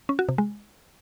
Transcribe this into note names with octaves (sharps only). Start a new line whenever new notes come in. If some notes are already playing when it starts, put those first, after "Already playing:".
C#4
F#4
C3
G#3